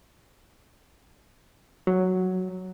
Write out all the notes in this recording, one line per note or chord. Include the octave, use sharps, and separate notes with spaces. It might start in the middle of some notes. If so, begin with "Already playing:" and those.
F#3